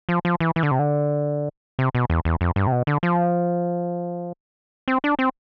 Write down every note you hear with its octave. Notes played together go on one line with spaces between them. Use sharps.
F3
F3
E3
E3
D3
C3
D3
C3
B2
E2
E2
F2
G2
C3
B2
D3
F3
C4
D4
C4